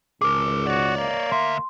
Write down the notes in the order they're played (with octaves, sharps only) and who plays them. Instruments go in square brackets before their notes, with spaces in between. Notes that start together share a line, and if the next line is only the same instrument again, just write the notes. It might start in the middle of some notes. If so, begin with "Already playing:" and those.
[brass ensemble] C#2 G#2 [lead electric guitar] G#4 A#4 [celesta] D6
[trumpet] F#4 [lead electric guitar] C#5 D5
[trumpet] A#3
[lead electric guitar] D2 E5 [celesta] C6